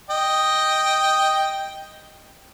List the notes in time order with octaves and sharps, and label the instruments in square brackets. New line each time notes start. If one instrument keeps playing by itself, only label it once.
[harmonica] D#5 G5